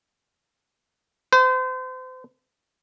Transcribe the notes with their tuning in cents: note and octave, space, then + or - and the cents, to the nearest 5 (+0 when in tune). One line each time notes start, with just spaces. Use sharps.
C5 -35